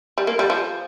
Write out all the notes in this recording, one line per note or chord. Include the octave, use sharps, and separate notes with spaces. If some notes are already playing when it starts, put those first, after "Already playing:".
G3
A#3
G3
F3